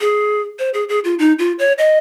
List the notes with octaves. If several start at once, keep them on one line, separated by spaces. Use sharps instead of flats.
G#4
C5
G#4
G#4
F4
D#4
F4
C#5
D#5